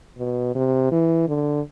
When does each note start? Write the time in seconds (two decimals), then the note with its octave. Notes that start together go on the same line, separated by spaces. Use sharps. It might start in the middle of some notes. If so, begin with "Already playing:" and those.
0.18 B2
0.55 C3
0.91 E3
1.28 D3